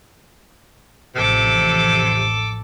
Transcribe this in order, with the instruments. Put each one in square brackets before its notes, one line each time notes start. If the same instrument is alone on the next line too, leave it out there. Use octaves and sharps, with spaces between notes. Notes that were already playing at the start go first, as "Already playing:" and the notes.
[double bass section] A1 F2 [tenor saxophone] C3 [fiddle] A4 D6